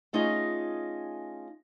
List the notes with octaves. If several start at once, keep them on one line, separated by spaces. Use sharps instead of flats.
A3 C#4 D#4 F4 G#4 D#5